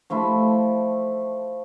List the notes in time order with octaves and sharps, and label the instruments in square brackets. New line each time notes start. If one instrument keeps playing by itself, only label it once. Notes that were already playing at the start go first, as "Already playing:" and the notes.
[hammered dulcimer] F3 A3 E4